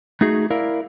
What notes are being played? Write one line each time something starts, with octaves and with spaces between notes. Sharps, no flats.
A3 D#4 F#4 G#4
E4 A#4 D5 F5